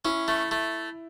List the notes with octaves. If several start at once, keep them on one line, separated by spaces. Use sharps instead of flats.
C#4 E4
A3
A3